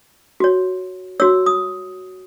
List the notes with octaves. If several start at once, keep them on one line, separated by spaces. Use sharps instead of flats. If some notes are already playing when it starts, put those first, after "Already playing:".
F#4 C#5
F#4 C#5 E6
D#6